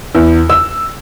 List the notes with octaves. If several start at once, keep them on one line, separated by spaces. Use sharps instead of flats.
E2
E6